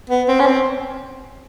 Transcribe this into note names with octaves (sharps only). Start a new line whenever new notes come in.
B3
C4
C#4
C4